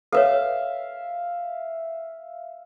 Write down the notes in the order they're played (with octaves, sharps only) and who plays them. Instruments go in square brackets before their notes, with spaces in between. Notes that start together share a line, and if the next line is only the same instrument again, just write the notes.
[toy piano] A4 B4 C#5 [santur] E5 F5